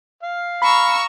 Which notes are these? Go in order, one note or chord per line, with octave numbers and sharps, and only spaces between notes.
F5
A#5 B5 C#6 E6